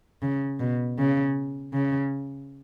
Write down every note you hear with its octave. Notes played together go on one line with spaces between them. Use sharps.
C#3
B2
C#3
C#3